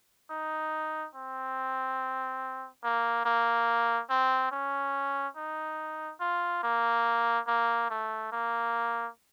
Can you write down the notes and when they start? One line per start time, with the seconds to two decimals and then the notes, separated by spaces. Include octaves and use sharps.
0.30 D#4
1.15 C4
2.84 A#3
3.25 A#3
4.10 C4
4.51 C#4
5.37 D#4
6.20 F4
6.63 A#3
7.47 A#3
7.90 A3
8.32 A#3